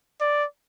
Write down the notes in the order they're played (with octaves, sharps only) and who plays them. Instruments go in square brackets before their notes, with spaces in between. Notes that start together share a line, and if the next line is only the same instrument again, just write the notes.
[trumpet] D5